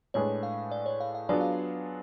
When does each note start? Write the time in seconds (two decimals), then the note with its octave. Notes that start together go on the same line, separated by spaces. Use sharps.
0.14 A2 G#3 D4 G#4 B4 C#5
0.43 F5
0.72 D5
0.86 C#5
1.00 F5
1.15 F5
1.29 F#3 B3 D4 F4 G#4 D5
1.41 F5